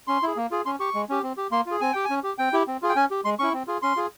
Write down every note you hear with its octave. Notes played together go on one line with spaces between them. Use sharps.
C#4 C6
E4 G#4
A#3
F4 G#4
C#4 C6
G4 C#6
G#3
C#4 G4
C4
G4
A#3 C6
F4 G#4
C4 G#5
G4 G5
G#5
C#4
G4
C4 G5
E4 G4
C4
F4 G#4
G5
C#4 G#5
G4
G#3 C6
C#4 E4 C#6
C4
F4 G#4
C#4 C6
F4 G#4